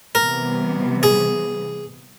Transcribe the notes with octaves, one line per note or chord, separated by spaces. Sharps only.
C3 E3 G3 B3 A#4
G#4